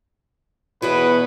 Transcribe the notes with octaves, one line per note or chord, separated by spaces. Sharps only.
E2 B2 B4 C#5 D#5